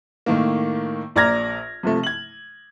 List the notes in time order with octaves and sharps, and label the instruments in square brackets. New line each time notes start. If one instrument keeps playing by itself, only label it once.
[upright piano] A2 D#3 A#3
A#1 D5 A#5 F6 G#6 A#6
C3 F3 A3
G#6 F#7